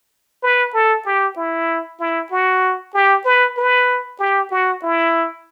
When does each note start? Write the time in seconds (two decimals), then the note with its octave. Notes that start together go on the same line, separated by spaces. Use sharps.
0.43 B4
0.74 A4
1.05 G4
1.37 E4
2.00 E4
2.31 F#4
2.94 G4
3.25 B4
3.57 B4
4.19 G4
4.51 F#4
4.83 E4